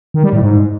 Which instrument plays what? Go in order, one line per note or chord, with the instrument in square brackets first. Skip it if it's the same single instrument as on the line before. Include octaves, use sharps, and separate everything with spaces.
[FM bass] D#3
G3
A2
G#2